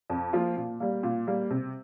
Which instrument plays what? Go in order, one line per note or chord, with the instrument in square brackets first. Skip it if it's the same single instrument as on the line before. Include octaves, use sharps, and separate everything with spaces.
[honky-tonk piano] F2
F3 A#3 F4
A#2
G3 A#3
A#2
G3 A#3
C3